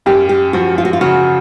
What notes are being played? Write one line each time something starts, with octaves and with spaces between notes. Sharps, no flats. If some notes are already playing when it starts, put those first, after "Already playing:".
F#2 G4
G4
F3 F#4
F4
F#4
F4
C#3 F#4